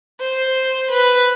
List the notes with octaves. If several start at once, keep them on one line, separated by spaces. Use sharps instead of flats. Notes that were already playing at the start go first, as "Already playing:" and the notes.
C5
B4